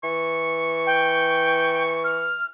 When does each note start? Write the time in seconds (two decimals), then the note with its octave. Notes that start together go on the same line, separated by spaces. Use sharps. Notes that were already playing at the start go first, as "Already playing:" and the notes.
0.04 E3 C#6
0.86 G5
2.04 F6